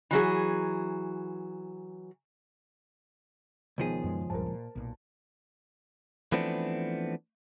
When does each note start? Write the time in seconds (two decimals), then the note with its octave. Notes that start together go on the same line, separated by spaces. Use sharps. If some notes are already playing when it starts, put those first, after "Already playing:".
0.11 E3 F#3 G#4
3.78 C#2 B2 D#3 F3 B3 G#4
4.03 F#2 G#3
4.30 D#1 A#1 G2 A#4 C5 A5
4.46 A#2
4.76 B1 A#2
6.32 E3 F3 A3 B3 C4 D4